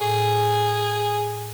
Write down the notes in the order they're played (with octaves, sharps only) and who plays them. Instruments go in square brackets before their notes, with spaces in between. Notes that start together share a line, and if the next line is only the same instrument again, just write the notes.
[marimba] A2 [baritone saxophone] G#4